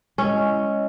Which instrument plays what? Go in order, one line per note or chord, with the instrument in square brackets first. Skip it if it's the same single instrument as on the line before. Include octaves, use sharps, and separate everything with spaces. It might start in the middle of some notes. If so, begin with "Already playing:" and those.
[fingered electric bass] G#3 [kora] C#4 [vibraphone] E4 C#5 D#5